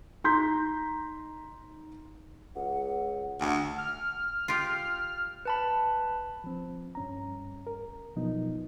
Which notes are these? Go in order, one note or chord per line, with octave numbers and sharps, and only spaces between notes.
D#4 A#5 C6 G6 B6
C#2 F#5
D2 F#5
F6
F4 G4
B4 A5 B5
F3 C4
G2 C#4 A#5
A#4
B2 F3 F#3 B3 D#4